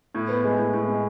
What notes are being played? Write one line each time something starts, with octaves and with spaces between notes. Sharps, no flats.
A2
B3
G#3
A2
A2
G#3